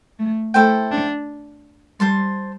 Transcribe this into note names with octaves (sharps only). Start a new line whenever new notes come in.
A3
A3 E4 A4 C5 G5
D4
G3 C5 A5 C6